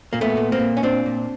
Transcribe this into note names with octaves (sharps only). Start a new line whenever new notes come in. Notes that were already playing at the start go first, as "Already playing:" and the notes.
A#2 A#3
A3 B3
A#2
A#3 C4
A#2
C#4
A#2 C4 D4
A#2